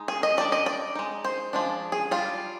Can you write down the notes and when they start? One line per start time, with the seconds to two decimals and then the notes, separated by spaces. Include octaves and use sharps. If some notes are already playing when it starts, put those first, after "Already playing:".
Already playing: G#3 D#4
0.08 G#4
0.23 D#5
0.37 G3 D4 D5
0.52 D#5
0.66 D5
0.95 G#3 D#4
1.24 C5
1.53 F3 G#3 D4
1.92 G#4
2.11 G3 D4 F4